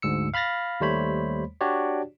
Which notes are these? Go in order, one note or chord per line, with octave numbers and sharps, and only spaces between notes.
D2 G#2 E6 C#7
F5 B5 F6 A6 A#6
D#2 G3 A3 C5 C#5 B5
D4 F#4 G4 C#5 D5